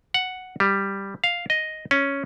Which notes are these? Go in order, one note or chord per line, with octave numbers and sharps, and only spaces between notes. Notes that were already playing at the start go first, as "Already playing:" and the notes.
F#5
G3
F5
D#5
C#4